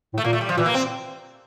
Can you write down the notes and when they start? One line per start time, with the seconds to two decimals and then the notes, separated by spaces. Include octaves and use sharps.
0.14 A2
0.18 A3
0.24 A#2 A#3
0.33 A3
0.41 G3
0.49 F3
0.57 A#2 E3
0.66 A#3
0.74 C4